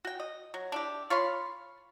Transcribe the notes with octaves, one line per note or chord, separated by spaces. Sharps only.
F#4 G5
D#5
F#3
D4 E4 G4
F4 C#5 B5 C6